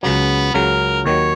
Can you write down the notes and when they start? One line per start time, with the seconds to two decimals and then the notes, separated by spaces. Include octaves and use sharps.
0.03 C#2 C#3 F#3 B3
0.54 C#2 C#3 F#3 A#4
1.05 D#2 D#3 F#3 C#5